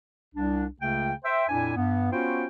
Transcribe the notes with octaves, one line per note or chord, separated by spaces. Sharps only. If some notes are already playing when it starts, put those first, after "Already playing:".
C2 D4
C#2 C#3 A3 G5
C5 E5 G5
F2 A#2 D4 E4 G#5
G2 B3
B3 C#4 F4 F#4 C5 G5